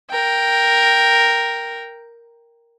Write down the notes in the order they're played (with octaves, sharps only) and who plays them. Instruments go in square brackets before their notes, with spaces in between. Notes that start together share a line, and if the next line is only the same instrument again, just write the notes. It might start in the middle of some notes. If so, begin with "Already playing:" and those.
[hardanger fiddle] A#4 G5